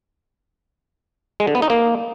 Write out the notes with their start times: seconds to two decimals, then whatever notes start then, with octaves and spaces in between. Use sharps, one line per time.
1.40 G#3
1.47 D3
1.55 B3
1.62 D#4
1.70 A#3